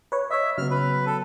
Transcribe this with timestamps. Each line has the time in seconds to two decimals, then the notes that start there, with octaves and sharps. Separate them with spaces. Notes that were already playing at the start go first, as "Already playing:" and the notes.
0.12 B4 C#5
0.31 C#5 D#5 E5
0.58 C#3 F#3 B3 F6
0.70 B4
1.06 A4